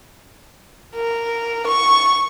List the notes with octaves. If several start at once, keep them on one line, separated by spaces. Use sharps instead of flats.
A#4
C#6